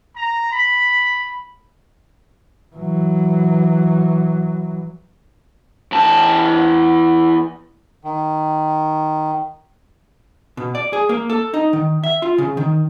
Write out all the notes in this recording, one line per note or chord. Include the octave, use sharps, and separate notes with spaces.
A#5
B5
E3 F#3
E2 A5
D#3
B2
D5
G#4
A#3
A4
D#4
D#3
E5
F4
C#3
D#3